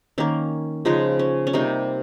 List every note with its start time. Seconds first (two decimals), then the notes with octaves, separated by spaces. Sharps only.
0.18 D#3 A#3 C#4
0.85 C#3 F3 G#3 D#4
1.19 C#4
1.47 C#4
1.53 C3 G3 A#3 D#4